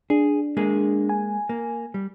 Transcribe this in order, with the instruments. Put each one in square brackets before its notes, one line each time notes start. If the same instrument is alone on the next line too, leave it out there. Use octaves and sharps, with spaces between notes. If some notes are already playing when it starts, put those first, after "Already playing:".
[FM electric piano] D4 [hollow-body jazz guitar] G#4
[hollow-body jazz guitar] G#3 A#3 G#4
[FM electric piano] G#5
[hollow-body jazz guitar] A#3
G3